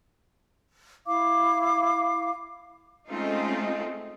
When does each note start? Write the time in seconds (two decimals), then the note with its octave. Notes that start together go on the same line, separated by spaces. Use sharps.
1.06 E4 F5 D6
3.09 G#3 A3 C4 C#4 D#4 F4